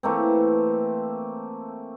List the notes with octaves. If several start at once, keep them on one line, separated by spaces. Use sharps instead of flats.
E3 A3 A#3 C4